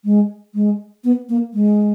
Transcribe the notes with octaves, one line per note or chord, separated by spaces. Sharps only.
G#3
G#3
B3
A#3
G#3